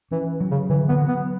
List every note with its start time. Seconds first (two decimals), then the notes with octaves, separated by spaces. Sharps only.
0.11 E3 C#4
0.41 F#3
0.51 C#3
0.69 D3 E3
0.89 B3
0.98 F#3
1.08 B3